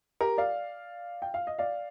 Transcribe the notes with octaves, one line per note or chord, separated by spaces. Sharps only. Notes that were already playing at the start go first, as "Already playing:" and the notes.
G4 A#4
D5 F5
G5
F5
D#5
D5 F5